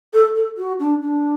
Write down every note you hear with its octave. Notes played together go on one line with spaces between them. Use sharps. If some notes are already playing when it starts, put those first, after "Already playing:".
A4
A4
F#4
D4
D4